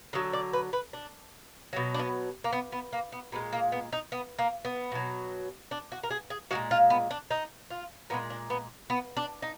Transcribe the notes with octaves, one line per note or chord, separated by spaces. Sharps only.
D3 F#3 D#5
D5
B4
B4
D4
B2 F#3
D4
B3
A#3
B3
B3
A#3
B3
A#2 F3 G#3 B3
A#3
B3
D#4
B3
A#3
B3
B2 F#3
D4
F#4
A#4
G#4
G#4
A#2 F3 G#3 F#4
F4
B3
D4
D#4
F4
A#2 F3 G#3 B3
D4
B3
B3
D4
D#4